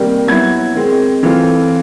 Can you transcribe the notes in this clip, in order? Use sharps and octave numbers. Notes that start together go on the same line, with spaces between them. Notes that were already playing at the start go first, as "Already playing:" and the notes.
Already playing: C3 D#3 G3 A#3
F#3 B3 E4 G#6
D#3 G#3 C4
E3 A3 C4 F4